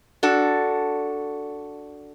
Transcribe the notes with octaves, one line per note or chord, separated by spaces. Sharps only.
D4 F#4 A4